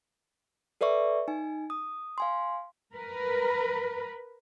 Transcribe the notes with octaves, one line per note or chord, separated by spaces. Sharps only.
A4 B4 D5 E5 C#6
D#4 G#5
D#6
F5 G#5 C6
A#4 B4